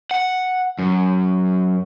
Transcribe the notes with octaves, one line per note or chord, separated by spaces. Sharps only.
F#5
F#2